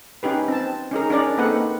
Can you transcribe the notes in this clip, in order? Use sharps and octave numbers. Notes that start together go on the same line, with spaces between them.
C#4 D#4 G4 B4
C4 A5
C#4 D#4 G#4 A#4
C#4 D4 A#4 D5
A#3 C4 D#4 A4 B4 F#5